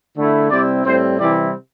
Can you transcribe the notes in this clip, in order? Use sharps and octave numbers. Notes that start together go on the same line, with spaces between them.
D3 A3 E4
C3 G3 C4 E4 D5
A2 G3 C4 E4 C5
C3 E3 G3 C4 E4 D5